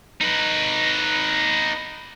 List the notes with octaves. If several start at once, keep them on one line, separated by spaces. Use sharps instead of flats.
D#4 B4